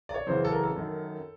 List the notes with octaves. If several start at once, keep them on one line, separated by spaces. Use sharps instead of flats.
D5
C#5
F#2 C#3 E3 C5
A4
A#4
A4
F#2 D#3